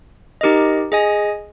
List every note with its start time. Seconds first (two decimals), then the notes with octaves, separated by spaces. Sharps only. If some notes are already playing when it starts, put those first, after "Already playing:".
0.41 D#4 G4 A#4 D#5
0.92 G#4 D#5 G#5